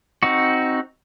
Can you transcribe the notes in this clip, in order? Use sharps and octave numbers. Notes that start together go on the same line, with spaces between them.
C4 D#4 F#4